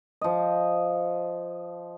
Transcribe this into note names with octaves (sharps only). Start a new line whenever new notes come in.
F3 D#5